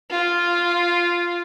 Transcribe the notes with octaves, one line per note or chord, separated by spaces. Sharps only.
F4